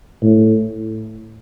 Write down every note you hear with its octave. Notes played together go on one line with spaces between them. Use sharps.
A2